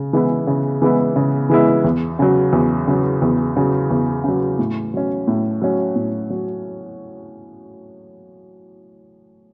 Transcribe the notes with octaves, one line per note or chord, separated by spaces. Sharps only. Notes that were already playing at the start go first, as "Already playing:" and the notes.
Already playing: C#3
E3 G#3 B3 E4
C#3
E3 G#3 B3 E4
C#3
E3 G#3 B3 E4
E2
C#3 F#3
E2
C#3 F#3
E2
C#3 F#3
E2
C#3 F#3
A2
F#3 C#4
A2
F#3 C#4
A2
F#3